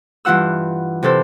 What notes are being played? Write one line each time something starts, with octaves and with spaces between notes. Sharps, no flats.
G2 E3 F4 F#5 E6
C3 E3 A4 C5